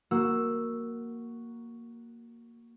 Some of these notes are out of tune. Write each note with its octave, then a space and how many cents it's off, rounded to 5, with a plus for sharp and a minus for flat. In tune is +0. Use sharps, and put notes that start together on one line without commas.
A#3 +0 F#4 +0 E6 +0